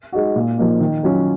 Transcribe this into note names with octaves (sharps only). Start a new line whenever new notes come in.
G#3 D#4 F#4
A#2
F3 A#3 D#4
D#3
F#3 C#4 F4